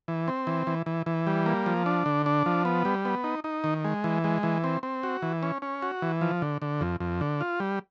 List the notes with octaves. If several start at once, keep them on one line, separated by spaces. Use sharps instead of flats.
E3
C4
E3
E3
E3
E3
G3
A#3
F3
D4
D3
D4
F3
B3
G3
B3
D#4
D#4
D#3
G#3
E3
G#3
E3
C4
C4
F#4
E3
C#4
C#4
F#4
E3
F3
D3
D3
F2
F2
D3
F4
G3